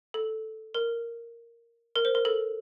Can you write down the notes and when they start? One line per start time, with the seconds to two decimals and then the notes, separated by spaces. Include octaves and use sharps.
0.14 A4
0.74 A#4
1.96 A#4
2.05 C5
2.15 A#4
2.25 A4